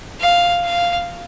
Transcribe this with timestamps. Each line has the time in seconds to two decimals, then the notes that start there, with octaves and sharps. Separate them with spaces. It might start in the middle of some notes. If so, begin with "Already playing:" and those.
0.21 F5
0.64 F5